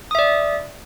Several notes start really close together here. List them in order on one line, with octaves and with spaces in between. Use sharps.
D#6 E5 D5